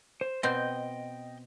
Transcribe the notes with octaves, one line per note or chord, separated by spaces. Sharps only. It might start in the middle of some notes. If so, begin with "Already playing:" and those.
C5
B2 C4 D#5 G5 G6